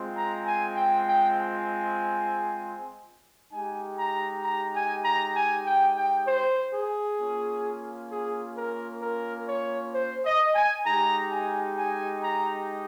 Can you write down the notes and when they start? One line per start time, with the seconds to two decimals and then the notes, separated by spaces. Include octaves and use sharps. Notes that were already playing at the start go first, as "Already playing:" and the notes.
Already playing: G#3 C4 F4
0.16 A#5
0.46 G#5
0.77 G5
1.07 G5
1.38 G#5
3.51 G#3 D#4 G4 G#5
3.98 A#5
4.44 A#5
4.74 G#5
5.05 A#5
5.35 G#5
5.66 G5
5.97 G5
6.27 C5
6.73 G#4
7.18 A#3 C#4 F4
8.11 G#4
8.56 A#4
9.02 A#4
9.48 C#5
9.94 C5
10.25 D#5
10.55 G#5
10.86 G#3 D#4 G4 A#5
11.31 G#5
11.78 G#5
12.23 A#5